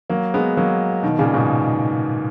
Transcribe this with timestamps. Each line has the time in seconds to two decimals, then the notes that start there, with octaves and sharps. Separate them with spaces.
0.10 F#3 A#3
0.34 G#3 B3
0.57 F#3 A#3
1.03 B2 D#3
1.19 A#2 C#3
1.34 G#2 B2